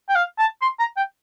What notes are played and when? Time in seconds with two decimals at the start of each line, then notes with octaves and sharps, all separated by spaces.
0.09 G5
0.15 F5
0.39 A5
0.62 C6
0.79 A#5
0.97 G5